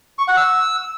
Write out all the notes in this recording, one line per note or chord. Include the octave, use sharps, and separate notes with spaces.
C#6
F#5
E6